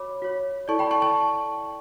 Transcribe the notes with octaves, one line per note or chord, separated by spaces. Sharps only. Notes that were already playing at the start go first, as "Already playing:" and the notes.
Already playing: F#4 C#5 B5 D6
F#4 C#5
E4 A4 D5 A5 C#6
G5 B5
A5 C#6
A5 C#6